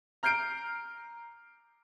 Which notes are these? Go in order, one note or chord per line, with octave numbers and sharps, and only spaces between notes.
A#5 F6 G6 C7 D7